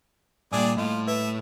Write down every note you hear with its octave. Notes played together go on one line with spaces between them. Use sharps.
A#2 G3 A#3 D4 G#4 D5
A2 A3 F4 D#5
B4 E5